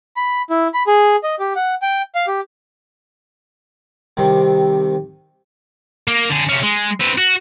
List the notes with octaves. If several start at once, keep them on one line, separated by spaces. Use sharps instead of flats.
B5
E4
B5
G#4
D#5
G4
F#5
G5
F5
G4
C2 C3 D#3 C4
A#3
D3 G#4
C3 C#4
G#3
C4 B4
F#4